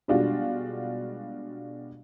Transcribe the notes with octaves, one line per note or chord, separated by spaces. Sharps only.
B2 G3 G#3 D4 F4 F#4